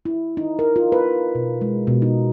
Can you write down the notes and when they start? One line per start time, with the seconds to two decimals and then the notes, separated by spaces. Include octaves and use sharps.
0.05 E4
0.37 D#4
0.59 A#4
0.76 F4
0.92 B4
1.35 B2
1.61 G#3
1.87 B2
2.02 D#4